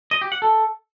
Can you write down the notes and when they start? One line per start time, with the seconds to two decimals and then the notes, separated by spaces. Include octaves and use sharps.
0.11 D#5
0.22 G4
0.32 F#5
0.42 A4